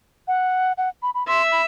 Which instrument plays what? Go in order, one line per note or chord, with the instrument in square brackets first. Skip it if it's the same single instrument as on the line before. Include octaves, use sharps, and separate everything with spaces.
[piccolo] F#5
F#5
B5
B5
[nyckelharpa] E5 [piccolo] C6
[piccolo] B5